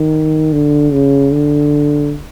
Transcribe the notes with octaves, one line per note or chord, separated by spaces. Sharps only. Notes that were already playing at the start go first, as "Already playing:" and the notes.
Already playing: D#3
D3
C#3
D3